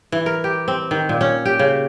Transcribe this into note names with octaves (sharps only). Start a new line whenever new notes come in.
E3
A#4
G4
C4
D#3
A#2
C#4
G4
C#3